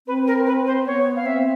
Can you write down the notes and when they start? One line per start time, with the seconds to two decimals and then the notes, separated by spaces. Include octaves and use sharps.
0.07 C4 B4
0.27 A#4
0.47 B4
0.66 C5
0.86 B3 C#5
1.16 F5
1.26 C4 E5